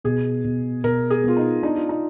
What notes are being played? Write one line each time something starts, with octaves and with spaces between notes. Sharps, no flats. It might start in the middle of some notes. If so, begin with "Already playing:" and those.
B2 G#4
B2
B2 A#4
G#4
B3 F4
D#4
D4 D#4
F4
D#4